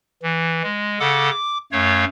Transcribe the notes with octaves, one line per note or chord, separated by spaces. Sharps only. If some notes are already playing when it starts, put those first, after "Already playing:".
E3
G#3
C#3 A4 F#5 D6
D6
F#2 A3 C#5 F5